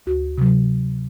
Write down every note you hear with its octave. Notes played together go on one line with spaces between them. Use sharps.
D2 F#4
C3 F#3